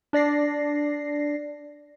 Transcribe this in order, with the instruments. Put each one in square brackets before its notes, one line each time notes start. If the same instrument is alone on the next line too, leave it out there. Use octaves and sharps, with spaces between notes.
[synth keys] D4 D5 A#6 C7